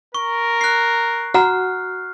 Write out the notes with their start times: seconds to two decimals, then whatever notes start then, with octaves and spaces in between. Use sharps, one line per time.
0.15 A#4 C#6
0.61 F#6 C7
1.34 F#4 F#5 A#5 F6